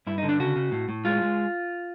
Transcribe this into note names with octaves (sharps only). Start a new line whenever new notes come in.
G2 E4
D#4
D3
D4
C#3 F#4
C#3
A2
A2
G#3 F4
G#3